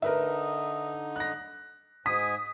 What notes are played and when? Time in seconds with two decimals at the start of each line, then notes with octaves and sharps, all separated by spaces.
0.02 D3 D#4 A#4 B4 E5
1.16 F#6 A#6
2.06 G#2 G#5 D#6 B6